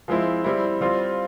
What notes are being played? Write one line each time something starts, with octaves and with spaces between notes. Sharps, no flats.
F3 G#3 C4 E4
G3 C4 E4
G3 C4 F4